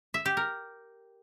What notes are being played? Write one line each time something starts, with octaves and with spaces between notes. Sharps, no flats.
E5
G4
A#4